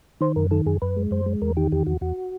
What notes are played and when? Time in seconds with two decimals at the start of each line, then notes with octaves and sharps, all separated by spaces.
0.21 D#3 C5
0.36 F#2 A#4
0.51 D#3 A4
0.66 F#2 G#4
0.82 F#2 B4
0.97 G#3
1.11 F#2 C5
1.26 G#3
1.41 E2 A#4
1.57 D#3 G4
1.72 E2 G4
1.86 E2 F#4
2.01 E2 F#4